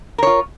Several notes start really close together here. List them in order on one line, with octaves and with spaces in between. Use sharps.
A#4 C#5 F4